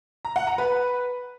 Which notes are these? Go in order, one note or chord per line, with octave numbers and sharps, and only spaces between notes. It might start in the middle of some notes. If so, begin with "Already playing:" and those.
A#5
F#5
A#5
B4